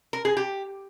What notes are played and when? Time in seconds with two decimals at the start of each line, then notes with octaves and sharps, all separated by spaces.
0.13 A#4
0.25 G#4
0.37 G4